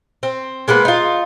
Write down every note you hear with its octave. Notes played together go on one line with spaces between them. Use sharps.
C4
G#3 A#3 B3 B4
D#4 F4